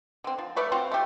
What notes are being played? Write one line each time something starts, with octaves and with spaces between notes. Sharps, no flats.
D3 C4
F3
A3 B4 C#5 D5
C4 F4 F#4 C5
A3 G4